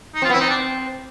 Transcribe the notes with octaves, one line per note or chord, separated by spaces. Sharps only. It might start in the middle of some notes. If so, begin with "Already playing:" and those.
D#4
C4
F4
B3
C4 E4
D#4
D4